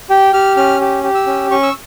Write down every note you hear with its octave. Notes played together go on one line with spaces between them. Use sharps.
G4 G5
G4 F6
C#4 F6
G4
G4
E6
C#4
C#4 C#6
E6